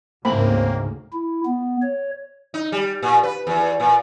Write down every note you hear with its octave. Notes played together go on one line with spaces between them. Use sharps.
D2 G#2 C#3 A3 A#3 C4 B5
E4
B3
C#5
D#4
G3
A#2
B4
E2
A#2